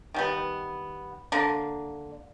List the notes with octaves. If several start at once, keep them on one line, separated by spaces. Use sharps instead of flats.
D#3 G3 B3
D3 A#3